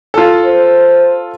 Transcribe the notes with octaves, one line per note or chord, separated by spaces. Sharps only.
F4 A4
C5